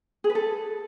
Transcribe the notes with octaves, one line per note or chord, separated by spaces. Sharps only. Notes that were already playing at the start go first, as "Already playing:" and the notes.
G#4
B4
A4